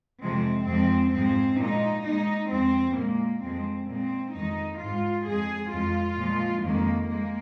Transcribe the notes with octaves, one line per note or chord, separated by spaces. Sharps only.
F2 C3 F3 G#3 C4
F2 F3 G#3 C4
G#2 F3 G#3 C4
A#2 G#3 D#4
A#2 G#3 D#4
F2 F3 G#3 C4
A#2 G#3 A#3
F2 F3 G#3 C4
A#2 G#3 C4
F2 D#3 G#3 D#4
G#2 G#3 F4
F2 F3 G#3 G#4
F2 F3 G#3 F4
A#2 F3 G#3
F2 D#3 G#3 A#3
G#3 A#3